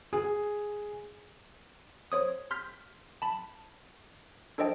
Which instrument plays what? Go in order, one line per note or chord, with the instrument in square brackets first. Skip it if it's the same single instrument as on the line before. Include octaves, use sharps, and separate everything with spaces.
[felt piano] G#4
[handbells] C5 C#5 D#6
C6 F6 G6 B6
A5 B5
D4 A4 C5 D5 D#5 G5